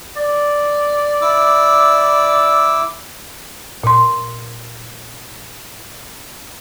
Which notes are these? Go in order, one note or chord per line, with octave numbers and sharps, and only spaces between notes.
D5
E4 D6 E6
A#2 C6